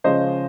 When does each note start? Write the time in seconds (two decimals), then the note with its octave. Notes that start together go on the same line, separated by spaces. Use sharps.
0.04 C#3 F3 G#3 C#4 C5 D#5